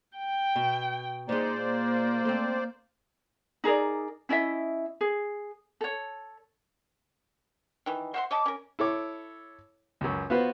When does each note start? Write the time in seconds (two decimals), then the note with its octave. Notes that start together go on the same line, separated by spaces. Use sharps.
0.18 G5
0.56 B2
1.29 A#2 G#3 D#4 C5 D5
1.61 A#3
2.25 A3 C4
3.64 D#4 G#4 A#4 D5
4.29 C#4 E4 D#5 E5
5.01 G#4
5.81 A4 C#5
7.86 D#3 E3
8.14 C5 E5 F#5 C6
8.31 C#5 D#5 A5 D6
8.46 C#4 A#4
8.79 E4 A4 C#5 D6
10.01 C#2 F#2
10.30 B3 F4 F#4 B4 C5